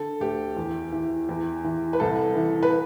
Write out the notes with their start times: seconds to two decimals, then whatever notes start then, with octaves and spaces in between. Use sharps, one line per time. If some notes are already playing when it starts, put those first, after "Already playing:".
Already playing: D3 A4
0.20 D2 G4
0.57 E2
0.92 E3
1.29 E2
1.64 E3
1.93 B4
2.00 C2 A4
2.35 E3
2.63 B4